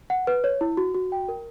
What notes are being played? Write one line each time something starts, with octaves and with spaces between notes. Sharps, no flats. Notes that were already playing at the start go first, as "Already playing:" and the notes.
F#5
B4
C#5
E4
F#4
F#4
G5
A#4